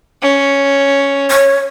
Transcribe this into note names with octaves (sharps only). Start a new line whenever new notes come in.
C#4
C#5